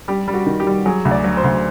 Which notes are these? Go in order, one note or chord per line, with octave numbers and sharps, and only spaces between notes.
G3 G4
G3
F#4
D#3
G4
G3
F#3 G#4
D2
D5
F#3
C5
D2